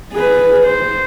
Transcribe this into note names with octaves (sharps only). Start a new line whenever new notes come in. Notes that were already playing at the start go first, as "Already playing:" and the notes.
G#4 B4
C5